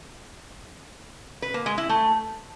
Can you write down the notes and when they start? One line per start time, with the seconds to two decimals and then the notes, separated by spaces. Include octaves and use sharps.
1.42 B4
1.54 A#3
1.66 G#3
1.78 E4
1.89 A3